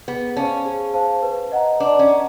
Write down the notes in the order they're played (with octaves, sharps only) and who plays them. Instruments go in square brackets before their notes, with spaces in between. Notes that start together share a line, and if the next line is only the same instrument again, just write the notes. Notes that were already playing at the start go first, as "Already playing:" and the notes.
[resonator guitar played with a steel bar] B3 [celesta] G#4
[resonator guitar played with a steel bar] C#4 [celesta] C5 F5 A5
[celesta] G#4
C5 F5 A5
B4
D#5 F#5 A#5
[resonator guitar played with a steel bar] D4 [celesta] B4
[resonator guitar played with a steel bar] C#4
[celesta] D#5 F#5 A#5